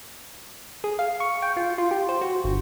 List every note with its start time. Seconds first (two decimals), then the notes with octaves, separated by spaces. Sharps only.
0.84 G#4
0.99 F5
1.20 C#6
1.42 G5
1.57 F4
1.78 F4
1.91 G4
2.09 C5
2.21 F#4
2.44 G1